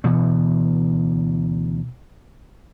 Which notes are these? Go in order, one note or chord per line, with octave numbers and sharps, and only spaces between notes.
D2 B2 E3 B3